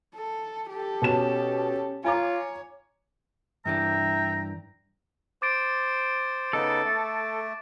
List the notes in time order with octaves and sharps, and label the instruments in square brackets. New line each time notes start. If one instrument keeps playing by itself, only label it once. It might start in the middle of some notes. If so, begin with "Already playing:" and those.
[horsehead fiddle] A4
G4 A4
[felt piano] B2 A5 E7 [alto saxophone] C#4
[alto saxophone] F4 [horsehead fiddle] C#5 [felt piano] G#5 A#5 D6
[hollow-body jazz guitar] G2 E3 D4 [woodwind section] E5 G5 A#5
[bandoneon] C5 [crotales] D6 A6 D7
[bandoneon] C#3 B3 D#4 [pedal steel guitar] A4
[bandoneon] A3